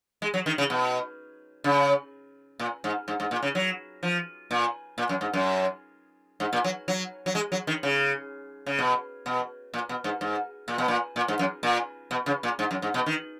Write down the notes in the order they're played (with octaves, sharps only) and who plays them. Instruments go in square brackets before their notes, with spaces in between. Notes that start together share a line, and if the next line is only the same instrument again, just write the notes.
[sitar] G#3
F#3
D#3
C#3
B2
C#3
A#2
G#2
G#2
G#2
A#2
C#3
F#3
F3
A#2
A#2
F#2
G#2
F#2
G#2
A#2
F#3
F#3
F#3
G#3
F#3
D#3
C#3
C#3
B2
B2
A#2
B2
G#2
G#2
A#2
B2
A#2
A#2
G#2
F#2
A#2
B2
C#3
A#2
G#2
F#2
G#2
B2
D#3